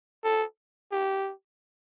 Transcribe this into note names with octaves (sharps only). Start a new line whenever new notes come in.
A4
G4